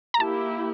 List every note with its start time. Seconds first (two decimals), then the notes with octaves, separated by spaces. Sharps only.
0.14 A#5
0.20 A#3 E4 G4 A5